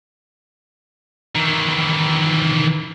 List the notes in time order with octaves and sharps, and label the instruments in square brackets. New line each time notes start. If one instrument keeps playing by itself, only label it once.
[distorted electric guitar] D#3 E3